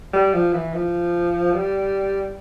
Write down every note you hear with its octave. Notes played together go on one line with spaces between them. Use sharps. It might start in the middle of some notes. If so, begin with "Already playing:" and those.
G3
F3
E3
F3
G3